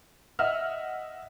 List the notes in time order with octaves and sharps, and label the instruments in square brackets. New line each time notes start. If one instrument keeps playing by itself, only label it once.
[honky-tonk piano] D#5 E5 F#5 E6 F6